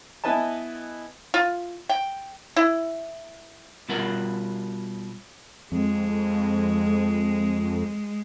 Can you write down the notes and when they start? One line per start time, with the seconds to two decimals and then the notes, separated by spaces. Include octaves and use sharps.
0.24 B3 E4 B4 D#5 G#5 A5
1.34 F4
1.89 G5
2.56 E4
3.89 B2 G3 F4 A#4 B4 F#5
5.72 F2 G#3